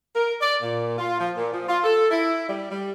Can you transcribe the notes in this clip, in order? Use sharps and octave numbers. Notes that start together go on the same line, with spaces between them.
A#4
D5
A#2
F4
F3
A#2
F3
F4
A4
E4
G3
G3